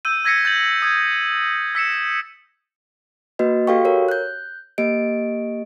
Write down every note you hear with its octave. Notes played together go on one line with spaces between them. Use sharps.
E6 G6 D#7
E6 G#6 A#6 B6 C#7
G6 A6 F#7
D#6 G#6
E6 B6 C#7 E7
A#3 F#4 B4 D#5
F#4 G4 A4 F5 G5 C#6
A#4 C#5
F#6 G6
A#3 G4 D#5 D7